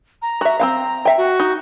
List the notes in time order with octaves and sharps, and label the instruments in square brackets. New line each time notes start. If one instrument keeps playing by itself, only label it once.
[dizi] A#5
[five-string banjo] F#4 E5
C4 D#4 F5
E5 G5
[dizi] F#4
[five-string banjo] D#4